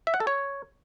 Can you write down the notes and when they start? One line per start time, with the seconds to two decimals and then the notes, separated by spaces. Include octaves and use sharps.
0.07 E5
0.14 F#5
0.20 A4
0.27 C#5